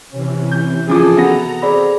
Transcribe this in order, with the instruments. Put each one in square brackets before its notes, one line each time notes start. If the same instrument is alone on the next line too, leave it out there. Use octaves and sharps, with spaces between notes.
[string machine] C3 E3 [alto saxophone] C#4
[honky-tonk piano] G6
[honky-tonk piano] C#3 F3 D6 [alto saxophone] G#4 [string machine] A4
[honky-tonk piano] B3 F#4 A#6 [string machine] A#5
[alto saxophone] C4 [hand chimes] G#4 D5 B5